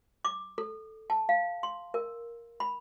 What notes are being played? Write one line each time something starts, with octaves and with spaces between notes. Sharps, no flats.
D6
A4
A5
F5
C6
A#4
B5